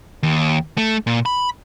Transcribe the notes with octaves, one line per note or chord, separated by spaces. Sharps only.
D#2
A3
A#2
B5